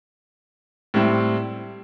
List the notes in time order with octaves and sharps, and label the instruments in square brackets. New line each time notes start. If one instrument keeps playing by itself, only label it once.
[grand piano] A2 G3 C4 E4